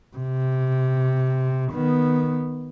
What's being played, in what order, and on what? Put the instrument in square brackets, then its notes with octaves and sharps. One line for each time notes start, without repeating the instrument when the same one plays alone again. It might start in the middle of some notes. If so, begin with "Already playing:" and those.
[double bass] C3
D#3 B3